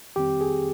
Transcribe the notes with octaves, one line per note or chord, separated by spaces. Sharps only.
F2 D#3 G3 C4 G4
G#4